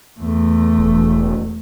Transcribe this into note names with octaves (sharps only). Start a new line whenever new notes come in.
E2 A3
E1